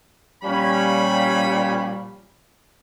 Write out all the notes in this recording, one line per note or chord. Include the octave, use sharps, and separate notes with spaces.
A#2 F3 G3 C#4 B5